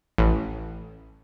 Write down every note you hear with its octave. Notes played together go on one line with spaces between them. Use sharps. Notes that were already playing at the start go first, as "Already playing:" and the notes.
A1